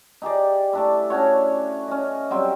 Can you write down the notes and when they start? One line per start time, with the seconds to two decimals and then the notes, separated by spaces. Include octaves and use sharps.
0.22 D#4 G4 G#4 D5
0.73 A3 D4 E4
1.10 C#4 D4 F#4 C#5
1.88 C#4 D#5
2.30 F#3 G3 C4 G5